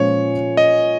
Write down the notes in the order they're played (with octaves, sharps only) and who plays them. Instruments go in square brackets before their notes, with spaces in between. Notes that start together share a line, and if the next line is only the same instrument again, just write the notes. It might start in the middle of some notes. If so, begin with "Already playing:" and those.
Already playing: [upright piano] A#2 F3 G#3 C#4 F4 [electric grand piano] C#5
[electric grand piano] D#5